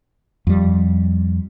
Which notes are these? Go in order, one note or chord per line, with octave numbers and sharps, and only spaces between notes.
F2 G3